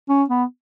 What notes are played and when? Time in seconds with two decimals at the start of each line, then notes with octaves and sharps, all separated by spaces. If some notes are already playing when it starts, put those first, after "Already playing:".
0.09 C#4
0.30 B3